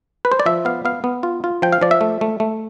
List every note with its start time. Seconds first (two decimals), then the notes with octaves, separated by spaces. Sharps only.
0.25 B4
0.32 C5
0.40 D5
0.46 F3 E5
0.65 B3 F5
0.85 B3 F5
1.04 B3
1.23 F4
1.44 F4
1.62 F3 G5
1.73 F5
1.81 F3 D5
1.91 E5
2.01 A3
2.21 A3
2.40 A3